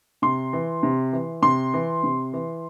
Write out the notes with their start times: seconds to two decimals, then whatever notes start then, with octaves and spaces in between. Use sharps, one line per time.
0.22 C3 C6
0.53 E3
0.83 C3
1.13 E3
1.42 C3 C6
1.74 E3
2.03 C3
2.33 E3